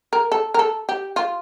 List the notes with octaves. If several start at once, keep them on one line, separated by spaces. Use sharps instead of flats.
A#4
A4
A#4
A4
G4
F4